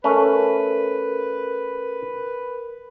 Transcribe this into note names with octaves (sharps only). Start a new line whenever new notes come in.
A3 C#4 A#4 B4